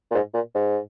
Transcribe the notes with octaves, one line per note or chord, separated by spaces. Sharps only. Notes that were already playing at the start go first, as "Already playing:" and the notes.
A#2
G#2
A#2
G#2